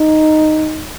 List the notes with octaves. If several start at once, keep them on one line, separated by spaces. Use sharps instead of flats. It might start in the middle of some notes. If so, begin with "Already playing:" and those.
Already playing: D#4